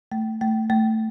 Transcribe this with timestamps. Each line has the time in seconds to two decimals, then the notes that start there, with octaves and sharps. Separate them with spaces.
0.12 A3
0.41 A3
0.70 A3